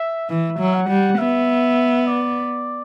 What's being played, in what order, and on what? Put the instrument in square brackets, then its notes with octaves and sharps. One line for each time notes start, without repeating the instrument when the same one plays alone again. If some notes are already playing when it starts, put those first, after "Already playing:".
Already playing: [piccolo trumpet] E5
[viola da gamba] E3 [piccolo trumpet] E5
[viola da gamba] F#3
[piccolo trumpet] F#5
[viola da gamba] G3
[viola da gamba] B3 [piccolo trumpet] E5
[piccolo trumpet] D5